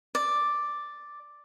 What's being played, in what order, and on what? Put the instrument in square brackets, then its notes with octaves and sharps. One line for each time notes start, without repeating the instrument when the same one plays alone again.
[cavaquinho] D5